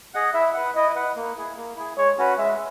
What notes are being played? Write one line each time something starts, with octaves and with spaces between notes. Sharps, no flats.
G#4 D#5 F#5
E4 E5
B4 F#5
E4 D#5
B4 F#5
A#3
E4 G#4
A#3
E4 G#4
G#3 C#5
C#4 F#4 B4
G#3 E5